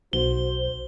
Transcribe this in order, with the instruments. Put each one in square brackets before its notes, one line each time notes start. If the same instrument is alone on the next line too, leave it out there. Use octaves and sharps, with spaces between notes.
[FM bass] B1 [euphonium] F#4 [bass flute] C5 [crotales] G7